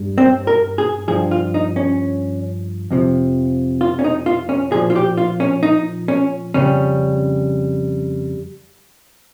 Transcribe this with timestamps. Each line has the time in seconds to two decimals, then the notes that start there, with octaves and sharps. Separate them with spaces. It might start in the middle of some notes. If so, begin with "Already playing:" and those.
Already playing: G2 G3
0.18 C4
0.47 A#4
0.78 G#4
1.08 G2 F3 G#4
1.31 F4
1.54 D#4
1.76 C#4
2.91 F2 C3 F3
3.81 F4
3.99 C#4
4.04 D#4
4.26 F4
4.49 C#4
4.72 A#2 F3 G#4
4.90 F4
4.96 G4
5.17 F4
5.40 C#4
5.63 D#4
6.08 C#4
6.54 F2 C#3 G3 C#4